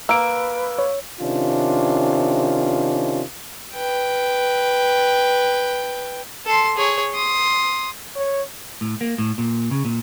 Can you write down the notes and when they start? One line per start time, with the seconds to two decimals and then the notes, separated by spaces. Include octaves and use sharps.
0.09 A#3 B4 E6 D7
0.78 C#5
1.20 C3 D#3 C#4 D4 F4
3.74 B4 G5
6.46 A4 C6
6.77 G#4 C#5
7.14 C6 D#6
8.16 C#5
8.81 A2
9.01 A#3
9.18 A2
9.38 A#2
9.71 C#3
9.85 A#2